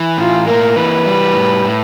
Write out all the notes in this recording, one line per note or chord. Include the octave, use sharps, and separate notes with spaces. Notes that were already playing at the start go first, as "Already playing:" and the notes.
Already playing: E3
A2 F4
A#3 A#4
E3 B4
G3
A2
A2